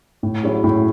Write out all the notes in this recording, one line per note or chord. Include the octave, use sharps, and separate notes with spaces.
A2
F#3 C#4 E4 G#4
A2